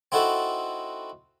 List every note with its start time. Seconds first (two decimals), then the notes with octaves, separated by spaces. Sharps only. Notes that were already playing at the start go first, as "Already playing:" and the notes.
0.12 C4 D#4 E4 F#4 A4